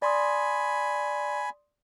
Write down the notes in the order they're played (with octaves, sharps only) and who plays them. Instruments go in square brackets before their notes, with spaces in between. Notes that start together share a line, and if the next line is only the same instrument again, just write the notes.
[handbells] D5 C6 D#6 [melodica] G#5 B5